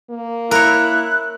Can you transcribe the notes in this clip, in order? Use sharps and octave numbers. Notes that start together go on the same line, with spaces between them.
A#3
E4 A#4 C#5 F#6